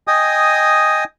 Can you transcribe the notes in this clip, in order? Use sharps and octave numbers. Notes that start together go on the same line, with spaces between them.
D#5 G5 G#5 D#6